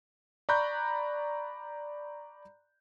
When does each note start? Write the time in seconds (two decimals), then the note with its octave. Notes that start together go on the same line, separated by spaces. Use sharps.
0.49 D5 A#5 B5 C#6 F#6 G6